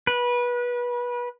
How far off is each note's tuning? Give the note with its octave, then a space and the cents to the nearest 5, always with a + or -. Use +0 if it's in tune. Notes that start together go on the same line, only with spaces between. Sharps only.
B4 -25